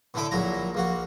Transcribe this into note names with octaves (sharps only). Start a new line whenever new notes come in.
A2 D3 A3 E4 A4 D6
A#1 A#2 F#3 E4 A#5
A#1 A#3 F#4